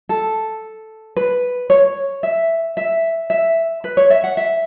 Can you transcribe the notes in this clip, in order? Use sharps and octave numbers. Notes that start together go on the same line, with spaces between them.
A4
B4
C#5
E5
E5
E5
B4
C#5
E5
F#5
E5